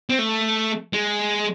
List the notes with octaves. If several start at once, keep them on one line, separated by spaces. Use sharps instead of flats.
C4
A3
G#3